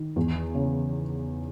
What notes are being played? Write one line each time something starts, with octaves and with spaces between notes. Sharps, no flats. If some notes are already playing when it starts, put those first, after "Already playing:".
Already playing: D#3
E2
C#3